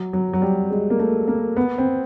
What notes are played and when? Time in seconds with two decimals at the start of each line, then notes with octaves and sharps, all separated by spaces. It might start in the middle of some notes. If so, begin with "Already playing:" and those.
Already playing: F#3
0.13 F#3
0.33 F#3
0.42 G3
0.71 G#3
0.90 A#3
0.99 A3
1.28 A#3
1.56 B3
1.78 C4